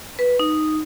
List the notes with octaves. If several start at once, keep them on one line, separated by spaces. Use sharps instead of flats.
B4
D#4